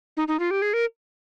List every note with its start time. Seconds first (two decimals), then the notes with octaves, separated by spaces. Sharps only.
0.17 D#4
0.28 D#4
0.39 F4
0.51 G4
0.62 G#4
0.73 A#4